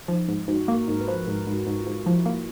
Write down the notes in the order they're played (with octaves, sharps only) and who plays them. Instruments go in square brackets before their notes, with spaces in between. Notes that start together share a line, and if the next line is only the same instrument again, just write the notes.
[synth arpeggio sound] F3 [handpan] D#4
[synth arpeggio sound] G#2
[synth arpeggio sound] G#2 [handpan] F#4
[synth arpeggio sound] A#3
[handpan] A#4
[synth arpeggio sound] G#2 [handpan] A#4
[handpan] B4
[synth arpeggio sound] F3
[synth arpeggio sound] G#2 [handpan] A#4
[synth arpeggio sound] G#2
[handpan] F#4
[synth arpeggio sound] G#2
[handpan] F4
[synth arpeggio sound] G#2
[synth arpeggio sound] F3 [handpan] E4
[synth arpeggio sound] A#3